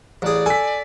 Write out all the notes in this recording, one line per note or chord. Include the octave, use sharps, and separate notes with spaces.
A1 G#4 D5
A4 G#5 B6